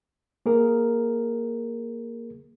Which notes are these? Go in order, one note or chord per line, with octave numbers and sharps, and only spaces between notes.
A#3 G#4 A#4